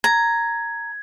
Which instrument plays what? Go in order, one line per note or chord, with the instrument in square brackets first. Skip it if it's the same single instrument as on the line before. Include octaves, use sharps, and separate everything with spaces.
[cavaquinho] A#5 [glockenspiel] G#6